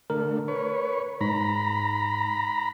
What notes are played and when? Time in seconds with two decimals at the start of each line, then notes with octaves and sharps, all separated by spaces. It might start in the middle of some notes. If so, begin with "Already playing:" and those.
0.10 D3 A3 A#4
0.48 B4 C#5
1.21 G#2 A#5 B5